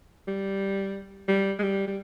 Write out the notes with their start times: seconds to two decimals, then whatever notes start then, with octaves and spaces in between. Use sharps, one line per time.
0.27 G3
1.28 G3
1.59 G#3
1.63 G3
1.87 G3